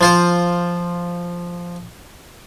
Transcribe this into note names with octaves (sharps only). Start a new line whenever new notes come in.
F3 F4 C5